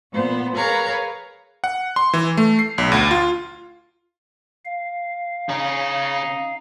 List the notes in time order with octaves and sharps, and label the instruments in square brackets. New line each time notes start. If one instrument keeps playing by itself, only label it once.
[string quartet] A#2 B3 C5
G#4 A#4 B4 C#5 F5 A#5
[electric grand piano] F#5
C6
E3
A3
C7
B1
D2
F4
[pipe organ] F5
[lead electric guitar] C#3 C#4 [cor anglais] D#4